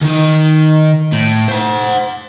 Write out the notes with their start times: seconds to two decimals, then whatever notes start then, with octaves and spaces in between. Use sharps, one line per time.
0.01 D#3 D#4
1.13 A2
1.49 C5 F#5